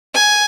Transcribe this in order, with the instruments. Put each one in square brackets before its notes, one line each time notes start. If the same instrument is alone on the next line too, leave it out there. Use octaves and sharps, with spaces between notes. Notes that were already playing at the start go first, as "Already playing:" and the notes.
[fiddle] G#5